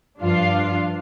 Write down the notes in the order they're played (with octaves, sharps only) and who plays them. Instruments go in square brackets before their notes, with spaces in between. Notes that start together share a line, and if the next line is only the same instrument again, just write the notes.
[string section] G2 F3 D4 F4 F5